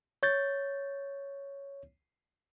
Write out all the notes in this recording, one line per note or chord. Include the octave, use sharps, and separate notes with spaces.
C#5 G6 A6